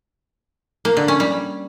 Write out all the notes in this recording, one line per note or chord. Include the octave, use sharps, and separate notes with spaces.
A#3
D3
C#4
G3